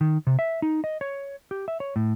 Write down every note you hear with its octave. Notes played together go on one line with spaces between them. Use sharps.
D#3
C3
E5
D#4
D#5
C#5
G4
E5
C#5
A2